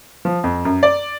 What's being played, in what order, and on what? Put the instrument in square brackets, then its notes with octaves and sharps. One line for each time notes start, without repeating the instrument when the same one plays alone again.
[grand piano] F3
F2
F#2
D5